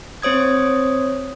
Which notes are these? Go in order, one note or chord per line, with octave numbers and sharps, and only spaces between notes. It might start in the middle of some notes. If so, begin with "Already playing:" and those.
C4 C5 C#5 D#6 G#6